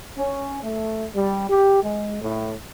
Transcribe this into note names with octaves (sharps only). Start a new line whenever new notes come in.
C#4
A3
G3
G4
G#3
A2